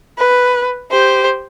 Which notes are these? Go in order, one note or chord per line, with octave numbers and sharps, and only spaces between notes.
B4
G4 C5